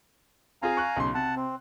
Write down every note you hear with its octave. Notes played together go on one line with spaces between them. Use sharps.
C4 F4 G#4 F5 G#5 A#5
C#6 F#6
B1 C#3 C6
C3 F#5 A5
C4